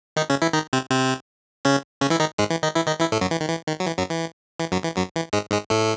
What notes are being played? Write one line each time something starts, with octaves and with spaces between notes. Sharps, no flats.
D#3 D#4
C#3 C#4
E3 E4
D#3 D#4
C3 C4
C3 C4
C#3 C#4
C#3 C#4
E3 E4
D#3 D#4
G#2 G#3
E3
D#3 D#4
E3 E4
D#3 D#4
E3 E4
A2 A3
F#2 F#3
E3
D#3
E3
D#3
F#3
E3
F#2 F#3
E3
E3
F#2 F#3
E3
F#2 F#3
E3
G#2 G#3
G#2 G#3
A2 A3